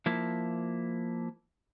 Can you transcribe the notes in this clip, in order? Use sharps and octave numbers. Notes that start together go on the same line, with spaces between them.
F3 A#3 E4